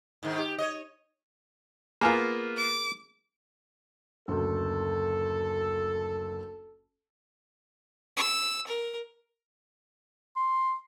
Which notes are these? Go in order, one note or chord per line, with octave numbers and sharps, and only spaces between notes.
G#2 D#3
G4
C#5 D#5
A#3 B3 F4 G#4 A#4
D6
F#1 D2 A4
E6
A#4
C6